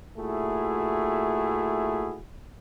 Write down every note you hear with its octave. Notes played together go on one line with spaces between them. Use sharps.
A#2 A3 E4 F#4 G#4